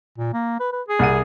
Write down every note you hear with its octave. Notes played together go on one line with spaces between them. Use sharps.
A#2
A#3
B4
B4
G#4
C2 F#5 D#7